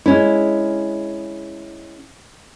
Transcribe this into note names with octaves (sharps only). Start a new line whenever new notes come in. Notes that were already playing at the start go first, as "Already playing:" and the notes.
G#3 C#4 E4